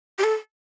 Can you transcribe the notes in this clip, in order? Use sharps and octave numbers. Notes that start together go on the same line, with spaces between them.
G4
A4